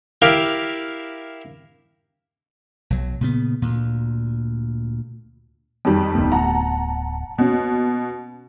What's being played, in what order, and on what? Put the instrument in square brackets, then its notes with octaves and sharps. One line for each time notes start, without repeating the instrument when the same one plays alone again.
[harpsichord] E4 G4 A#4 F5
[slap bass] B1 F#3
A#2 C#3 B3
D2 A#2
[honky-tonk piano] F2 D#3 G3
[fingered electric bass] D1 A3 B3
[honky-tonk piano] F#5 A5 A#5
[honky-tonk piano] B2 [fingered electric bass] A#3 C#4